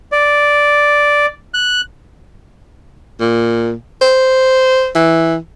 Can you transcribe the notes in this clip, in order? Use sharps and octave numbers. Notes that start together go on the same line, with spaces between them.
D5
F#6
A#2
C5
E3